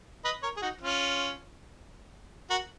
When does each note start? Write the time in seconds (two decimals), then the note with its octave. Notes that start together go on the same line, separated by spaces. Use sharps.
0.25 B4 D#5
0.43 A#4 C#5
0.56 G#4
0.62 D#4 F#4
0.81 C#4 F4
2.50 F#4 A#4